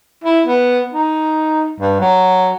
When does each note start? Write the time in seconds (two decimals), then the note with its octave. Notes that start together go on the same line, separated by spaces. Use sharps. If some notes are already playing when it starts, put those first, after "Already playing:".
0.24 E4
0.46 B3
0.92 D#4
1.80 G2
2.00 F#3